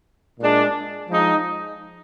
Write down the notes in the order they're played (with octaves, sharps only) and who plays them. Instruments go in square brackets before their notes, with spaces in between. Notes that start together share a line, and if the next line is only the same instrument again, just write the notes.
[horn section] A#2 G#3 D4
F3 G#3 D#4